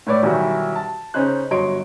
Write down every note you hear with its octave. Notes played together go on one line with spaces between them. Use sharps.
A2 B4 C#5 D5 D6
B1 D#3 E3 G3 E4 F#4
A5
C#3 C#4 D#4 C5 F#6
G1 F#3 C#5 D#5 C6 D7